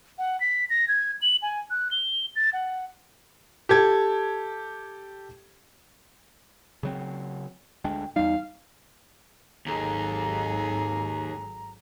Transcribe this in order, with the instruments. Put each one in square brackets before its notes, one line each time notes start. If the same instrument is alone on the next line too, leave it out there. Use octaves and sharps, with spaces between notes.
[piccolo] F#5
B6
A#6
G#6
F#7
G#5
F#6
G7
A6
F#5
[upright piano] G4 A4 G#6
[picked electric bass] C#3 F#3 C4
[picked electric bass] D2 G#3 D4 [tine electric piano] G5
[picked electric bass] E2 G3 [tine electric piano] D#4 [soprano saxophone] F5
[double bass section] G#1 F#3 [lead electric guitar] D#2 [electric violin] G#4 A4 [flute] A#5